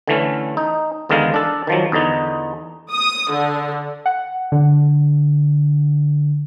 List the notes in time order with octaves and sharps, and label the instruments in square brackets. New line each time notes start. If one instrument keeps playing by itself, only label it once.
[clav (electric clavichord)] D3 E3 A3 C#4
D#4
E2 D3 D#3 G#3 A#4 F5
D4 A4
D#3 F3 F#3
E2 D3 D#4
[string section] D#6
D3
[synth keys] F#5
D3